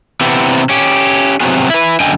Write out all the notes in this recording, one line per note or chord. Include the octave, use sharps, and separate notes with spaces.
C3 E3 B3 C4
C#4 G4
C3 F#3 B3 C4 F#4 G#4
E4 B4
F#2 D3 D#5 G5 G#5